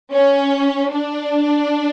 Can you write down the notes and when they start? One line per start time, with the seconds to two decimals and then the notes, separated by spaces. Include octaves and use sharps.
0.12 C#4
0.92 D4